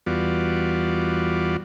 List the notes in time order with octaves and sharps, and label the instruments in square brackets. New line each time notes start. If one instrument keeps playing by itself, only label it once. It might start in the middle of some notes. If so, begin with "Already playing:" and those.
[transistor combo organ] E2 G3 B3 F4 F#4 D5